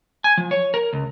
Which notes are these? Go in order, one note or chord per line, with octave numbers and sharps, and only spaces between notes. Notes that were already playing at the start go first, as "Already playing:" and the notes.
G#5
F3
C#5
A#4
C#2